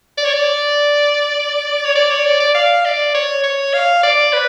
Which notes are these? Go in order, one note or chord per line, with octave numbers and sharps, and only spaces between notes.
D5
C#5
D5
C#5
D5
C#5
D5
D5
F5
D5
C#5
C#5
F5
D5
B4